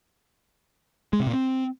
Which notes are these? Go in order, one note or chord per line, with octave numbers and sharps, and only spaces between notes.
G#3
C3
A#2
C4